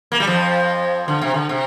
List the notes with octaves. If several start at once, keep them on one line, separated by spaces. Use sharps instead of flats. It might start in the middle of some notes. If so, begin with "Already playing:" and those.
A#3
G3
F2 F3
D3
C3
D3
C3